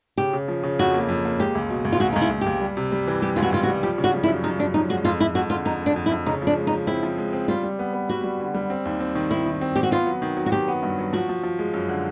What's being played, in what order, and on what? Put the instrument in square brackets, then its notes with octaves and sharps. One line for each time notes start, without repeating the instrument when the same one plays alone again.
[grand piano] C#3 [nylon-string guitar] G4
[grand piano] C#3
F3
C#3
[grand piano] F2 [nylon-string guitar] F#4
[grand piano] A#3
F2
A#3
[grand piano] G#3 [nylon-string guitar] G4
[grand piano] C#2
B2
C#2
[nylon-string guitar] F4
[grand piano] C#2 [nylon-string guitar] F#4
[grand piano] C#2 [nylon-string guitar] D#4
[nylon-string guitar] E4
[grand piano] C#2
[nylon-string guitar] G4
[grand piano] C#2
G3
C3
G3
E3
[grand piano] G3 [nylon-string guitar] G4
[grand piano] C#2 [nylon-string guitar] F4
[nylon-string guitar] F#4
[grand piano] C#2 [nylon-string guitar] F4
[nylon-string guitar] F#4
[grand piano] G3
[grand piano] F3 [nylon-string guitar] G4
[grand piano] C#3
[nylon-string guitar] F#4
[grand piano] F3
[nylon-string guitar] E4
[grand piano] F#2
[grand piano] F#2 [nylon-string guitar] D#4
[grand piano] F#2 [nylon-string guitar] D4
[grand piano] F3 [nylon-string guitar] D#4
[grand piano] G#3 [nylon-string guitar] F#4
[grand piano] F2 [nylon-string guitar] F4
[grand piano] F2 [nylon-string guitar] E4
[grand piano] F2 [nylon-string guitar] F#4
[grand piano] D3 [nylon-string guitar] F4
[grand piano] F2 [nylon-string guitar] D#4
[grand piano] D3
[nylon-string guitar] D4
[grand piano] F2
[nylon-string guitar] E4
[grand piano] F2
[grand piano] C#3 [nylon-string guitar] D#4
[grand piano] F3 [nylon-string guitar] D4
[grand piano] G#3
[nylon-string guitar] D#4
[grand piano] F3
[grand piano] C4 [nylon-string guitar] E4
[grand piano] F3
G#3
C4
[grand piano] G3 [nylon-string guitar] F4
[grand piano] G3
B3
B3
[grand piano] G3 [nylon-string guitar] F#4
[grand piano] G3
D3
G3
C4
D#2
C4
D#3
[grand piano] D#3 [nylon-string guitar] E4
[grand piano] D#3
C4
[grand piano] C4 [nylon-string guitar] G4
[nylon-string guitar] F#4
[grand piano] B3 [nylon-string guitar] F4
[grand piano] F#3
D#3
F#3
[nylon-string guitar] F#4
[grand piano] D#3 [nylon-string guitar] G4
[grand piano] B3
G2
F#3
[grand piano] F3 [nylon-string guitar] F#4
[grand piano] F3
F3
G#3
F#2
D3